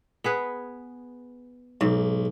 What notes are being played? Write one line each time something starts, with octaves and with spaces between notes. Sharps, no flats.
B3 G#4 B4
B1 G#2